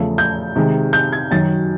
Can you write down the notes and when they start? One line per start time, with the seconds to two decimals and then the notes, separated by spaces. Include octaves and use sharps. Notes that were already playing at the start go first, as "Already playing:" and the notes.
Already playing: E2 C#3 F3 A3
0.18 G6
0.56 C3 D#3 G#3
0.93 G6
1.12 G#6
1.31 F#2 D#3 F#3 A6